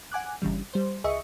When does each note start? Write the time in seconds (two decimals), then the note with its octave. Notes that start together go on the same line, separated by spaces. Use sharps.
0.12 F#5 G#5 D6 F#6
0.42 G1 C#3 E3 G3
0.73 G3 C5
1.04 C#2 G#4 D#5 E5 C#6 C#7